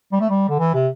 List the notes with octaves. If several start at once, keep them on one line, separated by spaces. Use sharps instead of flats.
G3
A3
G3
D3
E3
C3